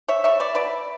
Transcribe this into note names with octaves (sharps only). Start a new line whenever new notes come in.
C#5 E5
G3 A#3 C#5 E5
B4 D5
B2 B4 D5